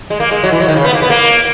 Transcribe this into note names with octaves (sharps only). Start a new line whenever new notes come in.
G#3
A#3
G#3
F#3
E3
F#3
D#3
C#3
B3
A#3
B3
A#3